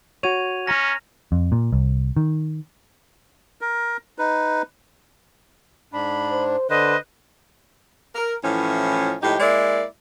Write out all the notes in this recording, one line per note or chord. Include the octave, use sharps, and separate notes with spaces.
F#4 C#5 G#6 D#7 F7
C#4 A#5 F6 A#6
F2
A#2
C2
D#3
A#4
D#4 B4
G#2 D4 B5
C5
D3 B4 C5 D#5
A#4
A2 E3 F3 C#4
A2 F3 G#3 D#4 G4
G#3 A#3 E4 D5